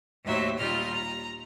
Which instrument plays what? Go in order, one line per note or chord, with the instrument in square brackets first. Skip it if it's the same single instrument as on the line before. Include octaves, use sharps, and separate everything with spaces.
[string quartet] D#2 A2 F#3 C5 E5
D#2 A#2 G3 F4 D#5 F6
A#5